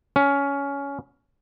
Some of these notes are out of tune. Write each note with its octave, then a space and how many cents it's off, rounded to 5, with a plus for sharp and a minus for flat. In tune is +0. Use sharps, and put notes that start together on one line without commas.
C#4 +15